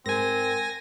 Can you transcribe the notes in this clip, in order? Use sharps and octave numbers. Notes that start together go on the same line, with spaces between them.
G#2 C4 A#4 G#5 A#6